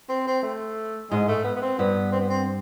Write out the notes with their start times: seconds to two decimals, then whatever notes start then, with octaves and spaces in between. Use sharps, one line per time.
0.09 C4
0.27 C4
0.43 A3
1.11 G#2 G#3
1.28 A3
1.44 B3
1.56 B3
1.62 C4
1.79 G2 B3
2.12 C4
2.21 B3
2.30 C4